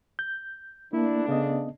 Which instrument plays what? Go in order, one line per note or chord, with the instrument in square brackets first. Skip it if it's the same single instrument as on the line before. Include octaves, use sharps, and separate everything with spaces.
[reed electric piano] G6
[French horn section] D3 A3 D4 [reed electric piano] A#3 [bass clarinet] E4
[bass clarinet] C#3 [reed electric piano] B3 C#4 D#5